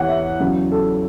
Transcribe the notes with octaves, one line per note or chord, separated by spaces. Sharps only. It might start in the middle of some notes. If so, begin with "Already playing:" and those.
Already playing: E2 E3 C#5 F#5
E5
E2 C#3 F#3
A4